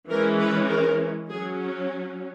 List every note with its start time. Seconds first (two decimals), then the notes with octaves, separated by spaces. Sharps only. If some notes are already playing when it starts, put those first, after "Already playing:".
0.10 E3 G#3 C#4 A#4
0.40 B4
0.69 A#4
1.29 F#3 C#4 G#4